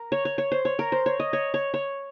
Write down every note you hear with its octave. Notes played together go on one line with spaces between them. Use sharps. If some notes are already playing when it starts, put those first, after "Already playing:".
Already playing: A#4
C#5
C#5
C#5
C5
C#5
A#4
C5
C#5
D#5
C#5
C#5
C#5